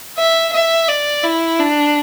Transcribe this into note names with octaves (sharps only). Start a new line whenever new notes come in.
E5
E5
D5
E4
D4